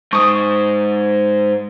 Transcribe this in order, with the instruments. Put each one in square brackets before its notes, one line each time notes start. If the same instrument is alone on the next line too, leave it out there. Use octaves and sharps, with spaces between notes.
[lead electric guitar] G#2 G#3 [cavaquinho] C#6 D#6